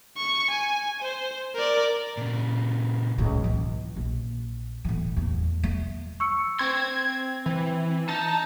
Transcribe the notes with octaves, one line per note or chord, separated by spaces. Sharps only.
C#6
G#5
C5
A#4 D5
A#2 C#3
C#2 A2
E3 F4
A#1
A2 E3
E2 A3
A3
C#6 E6 C#7
C4 C6 G#6
E3
D#4 A5